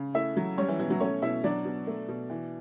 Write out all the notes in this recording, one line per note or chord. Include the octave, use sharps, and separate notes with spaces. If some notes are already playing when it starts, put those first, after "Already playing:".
Already playing: C#3
A3 E4 E5
F#3
G3 C#4 C#5
E3 E4
B2 E3 E4
F#3 F#4
A3 C#4 C#5
B2 E4 E5
F#3 D4 D5
B2
A3
B2
E3